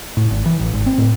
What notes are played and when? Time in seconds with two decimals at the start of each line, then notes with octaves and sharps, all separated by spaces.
0.17 A2
0.31 G#1
0.46 E3
0.59 A1
0.73 G#1
0.86 C4
0.98 A2